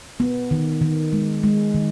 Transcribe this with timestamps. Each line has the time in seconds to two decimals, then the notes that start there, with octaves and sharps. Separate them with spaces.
0.20 B3
0.51 D#3
0.82 D#3
1.13 G#3
1.43 G#3
1.74 D#3